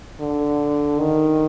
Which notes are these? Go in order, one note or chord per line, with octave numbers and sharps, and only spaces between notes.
D3
D#3